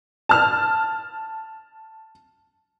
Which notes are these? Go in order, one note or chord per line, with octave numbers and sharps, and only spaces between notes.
A5 F6